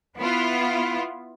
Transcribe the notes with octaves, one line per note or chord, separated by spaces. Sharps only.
B3 E4 F4